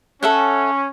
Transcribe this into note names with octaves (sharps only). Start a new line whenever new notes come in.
C#4 A4 E5 F#5